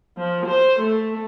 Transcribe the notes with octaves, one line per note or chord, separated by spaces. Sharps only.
F3
C5
A3